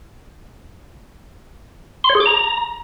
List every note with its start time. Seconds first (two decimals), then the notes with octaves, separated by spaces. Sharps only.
2.04 C6
2.10 C#5
2.15 G#4
2.20 D6
2.26 A#5